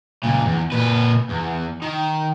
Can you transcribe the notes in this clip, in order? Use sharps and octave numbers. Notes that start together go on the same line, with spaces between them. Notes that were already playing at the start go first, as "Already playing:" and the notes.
C#2 A#2
E2
A#2 B4
E2
D#3